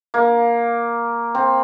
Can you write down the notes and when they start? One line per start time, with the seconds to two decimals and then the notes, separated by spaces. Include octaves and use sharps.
0.14 A#3
1.35 C4